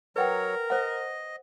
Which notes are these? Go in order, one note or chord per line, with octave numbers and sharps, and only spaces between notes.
F#3 A#4 B4 C#5 F#5 G5
C5 D#5 F#5